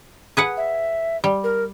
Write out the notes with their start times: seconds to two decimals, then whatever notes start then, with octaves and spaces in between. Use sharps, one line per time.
0.37 G#4 B4 F#5
0.57 E5
1.24 G3
1.44 A#4